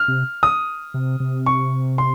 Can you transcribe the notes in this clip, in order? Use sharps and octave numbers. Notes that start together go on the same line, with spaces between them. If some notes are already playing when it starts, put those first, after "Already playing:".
Already playing: F6
C3
D#6
C3
C3
C#6
C6